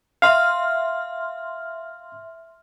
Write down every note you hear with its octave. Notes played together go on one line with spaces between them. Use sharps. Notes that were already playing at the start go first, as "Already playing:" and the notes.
E5 F5 C6 F6